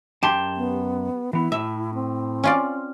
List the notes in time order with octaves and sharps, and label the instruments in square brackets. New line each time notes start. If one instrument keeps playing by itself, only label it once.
[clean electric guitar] F#2 A5 C6 [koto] G4
[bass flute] B3
[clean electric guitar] E3 B3 [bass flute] E4
[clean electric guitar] A2 [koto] E5
[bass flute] C4
[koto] C#4 F4 D5